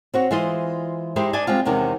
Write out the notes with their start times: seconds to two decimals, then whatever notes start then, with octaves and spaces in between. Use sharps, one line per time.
0.14 C4 F#4 C#5
0.31 E3 G#3 F4 C5 D#5
1.16 G#3 D#4 E4 G4 C5
1.33 D4 D5 D#5 G#5 A5
1.47 G3 G#3 C4 F4
1.65 E2 C3 D#3 G#3 C#4